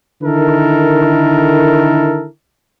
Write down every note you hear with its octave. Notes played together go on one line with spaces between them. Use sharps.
D3 D#3 E4 A4 A#4